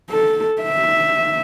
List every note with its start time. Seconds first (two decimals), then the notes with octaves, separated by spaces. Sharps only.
0.10 A4
0.62 E5